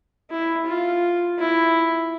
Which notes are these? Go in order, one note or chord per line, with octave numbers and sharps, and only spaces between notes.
E4
F4
E4